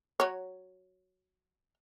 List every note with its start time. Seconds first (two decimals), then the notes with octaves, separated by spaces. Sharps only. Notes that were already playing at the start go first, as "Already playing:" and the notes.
0.20 F#3 C#5